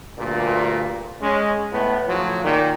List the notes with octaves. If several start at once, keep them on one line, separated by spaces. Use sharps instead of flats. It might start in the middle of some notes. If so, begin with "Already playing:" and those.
D2 G2 A#2
G#3 C#4
A2 B3
A2 C#3 F3 F#3
A#2 D#3